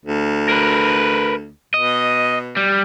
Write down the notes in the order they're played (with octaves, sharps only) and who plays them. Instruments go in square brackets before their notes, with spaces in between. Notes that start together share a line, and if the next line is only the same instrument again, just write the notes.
[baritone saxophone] D2
[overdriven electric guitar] A#4 B4
[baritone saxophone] B2 [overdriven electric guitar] D#5
[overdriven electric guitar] G3